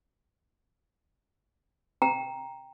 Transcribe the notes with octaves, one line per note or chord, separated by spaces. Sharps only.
G5 A#5